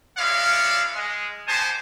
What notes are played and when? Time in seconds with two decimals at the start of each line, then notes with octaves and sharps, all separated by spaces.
0.18 G#3 D4 E4 F4 C#5 F5
0.95 G#3
1.47 B3 D#4 G4 C5 G#5 A5